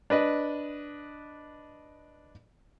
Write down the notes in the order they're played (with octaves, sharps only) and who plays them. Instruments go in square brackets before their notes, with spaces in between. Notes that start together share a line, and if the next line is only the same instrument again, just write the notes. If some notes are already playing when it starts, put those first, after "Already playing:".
[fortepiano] D4 B4 D#5